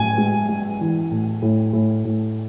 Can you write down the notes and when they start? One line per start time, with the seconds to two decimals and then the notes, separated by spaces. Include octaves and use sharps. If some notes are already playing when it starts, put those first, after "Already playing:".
Already playing: A2 G#5
0.18 G#3
0.49 G#3
0.81 E3
1.11 A2
1.42 A2
1.73 A2
2.05 A2